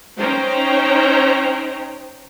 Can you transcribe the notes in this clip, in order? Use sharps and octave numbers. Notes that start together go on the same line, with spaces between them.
C#4 D#4 C5 G5 A#5